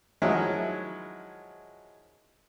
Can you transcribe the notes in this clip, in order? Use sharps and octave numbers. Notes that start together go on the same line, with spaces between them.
D#3 F3 F#3 G#3 E4